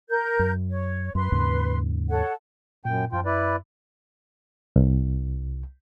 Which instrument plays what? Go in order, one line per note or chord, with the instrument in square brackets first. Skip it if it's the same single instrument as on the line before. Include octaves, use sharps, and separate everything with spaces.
[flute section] A#4 G6
[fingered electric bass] F#2
[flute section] C#5
[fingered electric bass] F#2 [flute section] B4 C6
[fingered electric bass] D#2 G#2 C#3
[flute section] A4 C#5 F#5
[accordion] F#2 G5 [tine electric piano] A#2
[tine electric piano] F#2 [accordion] F3 F4 G5
[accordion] E4 B4 D5
[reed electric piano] C2